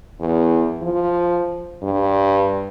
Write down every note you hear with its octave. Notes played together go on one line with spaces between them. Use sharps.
E2
F3
G2